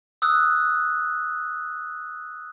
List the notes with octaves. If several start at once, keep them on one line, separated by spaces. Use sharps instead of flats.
D#6 E6 F#6